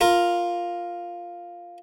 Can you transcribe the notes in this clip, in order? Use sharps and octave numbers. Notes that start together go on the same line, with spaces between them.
F4 A#4